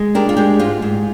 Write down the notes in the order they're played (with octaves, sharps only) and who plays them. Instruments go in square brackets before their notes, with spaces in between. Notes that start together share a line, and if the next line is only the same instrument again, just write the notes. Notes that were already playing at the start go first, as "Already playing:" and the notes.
Already playing: [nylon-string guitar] G#3
D4 G4 A#4
F4
G#3 G4
G#2 F4
G#2